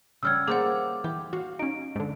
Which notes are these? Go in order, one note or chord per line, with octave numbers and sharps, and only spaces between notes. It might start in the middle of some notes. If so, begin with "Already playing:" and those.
C#3 G3 F#5 E6 F6 G#6
A#3 G#4 C5 D5 F#5 D6
E3 G4
F#4 F5
C#4 D#4 D7
G#2 D3